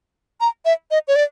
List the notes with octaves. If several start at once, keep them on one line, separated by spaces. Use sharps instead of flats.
A#5
E5
D#5
C#5
D5